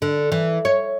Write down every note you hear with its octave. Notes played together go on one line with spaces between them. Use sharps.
D3
E3
C#5